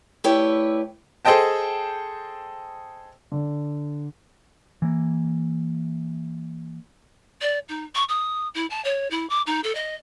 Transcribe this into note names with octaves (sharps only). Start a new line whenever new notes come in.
A3 E4 G4 B4 C#5 D5
G#4 A4 C5 D#5 G5 A5
D3
E3 A#3
D5
D#4
C#6
D#6
E4
A5
C#5
E4
D6
D#4
A4
D#5